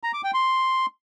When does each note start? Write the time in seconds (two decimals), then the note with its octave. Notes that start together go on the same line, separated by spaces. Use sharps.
0.03 A#5
0.14 D6
0.24 G5
0.34 C6